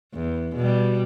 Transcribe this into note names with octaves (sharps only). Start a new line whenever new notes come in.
E2
B2 G3